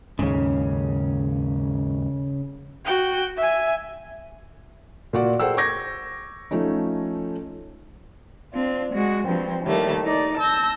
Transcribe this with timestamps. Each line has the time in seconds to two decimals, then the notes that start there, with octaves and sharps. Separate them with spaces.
0.19 D#2 G#2 C#3 C#4
2.85 F#4 G5
3.37 E5 G#5
5.13 A#2 F#4 D5
5.39 G#4 A#4 C5 F#5 G5 E6
5.57 C#6 D6 G6 G#6 A#6
6.51 F3 A3 C#4 D#4
8.53 C4 D4 F4
8.93 G#3 F#4
9.26 G2 F3 C4
9.64 A2 D#3 G3 A3 A#3
10.04 D#4 D5
10.38 A5 E6 G6 A#6